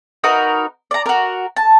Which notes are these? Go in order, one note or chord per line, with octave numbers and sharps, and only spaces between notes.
D#4 F#4 A#4 B4
D5 A#5
F#4 A#4
A5